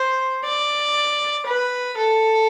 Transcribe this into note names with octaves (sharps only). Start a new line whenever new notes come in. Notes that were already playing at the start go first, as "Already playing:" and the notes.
Already playing: C5
D5
B4
A4